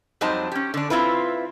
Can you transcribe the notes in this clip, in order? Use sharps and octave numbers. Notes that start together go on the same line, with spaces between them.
F2 F#3 G3 D#4 C5 A5
C#4 G4
D3 D4
C4 E4 F4 B4